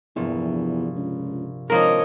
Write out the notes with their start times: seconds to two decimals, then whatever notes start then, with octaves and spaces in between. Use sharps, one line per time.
0.16 A#1 E2 G2 C3
0.96 C#2
1.70 G#1 F3 A#3 D4 F4 A#4 C#5 D#5